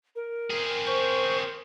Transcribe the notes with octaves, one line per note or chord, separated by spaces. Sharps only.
A#4
C4 G#4
C5 C#6